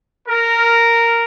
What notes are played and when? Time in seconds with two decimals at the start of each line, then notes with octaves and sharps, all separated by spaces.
0.28 A#4